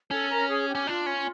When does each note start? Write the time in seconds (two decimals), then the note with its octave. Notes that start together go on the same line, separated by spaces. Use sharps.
0.11 C#4 A4
0.30 A#4
0.49 G#4
0.68 G4
0.75 C#4
0.87 D4 F4
1.06 C#4